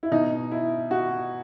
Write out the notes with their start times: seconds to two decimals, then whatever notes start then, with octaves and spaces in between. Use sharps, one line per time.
0.03 E4
0.11 B2 D#4
0.52 E4
0.91 F#4